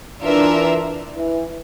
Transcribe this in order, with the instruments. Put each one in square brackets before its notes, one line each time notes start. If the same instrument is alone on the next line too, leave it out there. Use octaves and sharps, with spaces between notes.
[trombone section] E3 [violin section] D4 F4 A#4 E5
[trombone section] E3